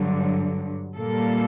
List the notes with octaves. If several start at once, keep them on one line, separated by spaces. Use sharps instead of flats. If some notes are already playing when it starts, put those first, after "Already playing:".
Already playing: G2 D3 F#3
A#2 G3 A#3 A4